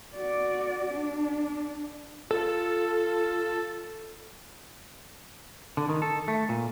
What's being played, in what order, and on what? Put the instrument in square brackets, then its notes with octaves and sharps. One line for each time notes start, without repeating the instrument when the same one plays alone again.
[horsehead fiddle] F#4 D5
D4
[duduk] F4 [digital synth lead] A4
[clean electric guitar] D3
D#3
A4
A3
A#2